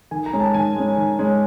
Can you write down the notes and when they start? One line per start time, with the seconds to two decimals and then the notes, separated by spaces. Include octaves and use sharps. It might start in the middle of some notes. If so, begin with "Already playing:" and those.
0.11 D#3 G#5
0.26 A#5
0.33 G#3 C#4
0.40 A5
0.54 D#3 G#5
0.76 G#3 C#4
0.97 D#3
1.19 G#3 C#4